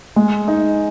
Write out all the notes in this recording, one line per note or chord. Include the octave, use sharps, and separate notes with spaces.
G#3
D#4